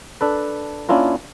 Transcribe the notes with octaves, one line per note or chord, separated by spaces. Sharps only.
D4 A4 B4
A#3 C#4 D4 E4 F4 A#4